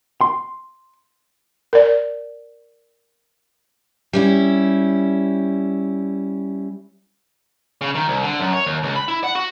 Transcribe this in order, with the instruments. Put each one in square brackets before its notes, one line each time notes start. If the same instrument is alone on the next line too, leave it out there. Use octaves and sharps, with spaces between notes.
[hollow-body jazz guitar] C6
[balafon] A#4 D5
[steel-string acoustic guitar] G3 C#4 E4
[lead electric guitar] C#3
D#3
C2
D3
F#2
C#5
D#2
C#2
B5
E4
F#5
F#4